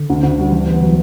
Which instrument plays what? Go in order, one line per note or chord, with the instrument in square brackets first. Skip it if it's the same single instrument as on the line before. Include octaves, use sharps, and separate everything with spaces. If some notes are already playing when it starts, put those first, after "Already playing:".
Already playing: [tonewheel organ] D3
[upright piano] D2
D2
G3
[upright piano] D2 [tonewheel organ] E3
[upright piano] B3
F#3